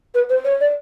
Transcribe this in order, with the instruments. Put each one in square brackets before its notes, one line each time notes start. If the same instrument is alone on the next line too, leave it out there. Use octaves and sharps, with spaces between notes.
[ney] B4
C5
C#5
D5